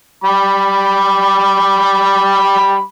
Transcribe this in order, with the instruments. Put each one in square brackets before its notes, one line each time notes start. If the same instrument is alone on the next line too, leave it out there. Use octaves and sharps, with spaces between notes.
[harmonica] G3 B5 D6